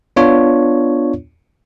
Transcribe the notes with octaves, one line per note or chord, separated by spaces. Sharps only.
B3 D4 F4 C#5